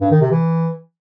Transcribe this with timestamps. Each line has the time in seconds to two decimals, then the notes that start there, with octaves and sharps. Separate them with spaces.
0.01 G2
0.11 D#3
0.21 C3
0.31 E3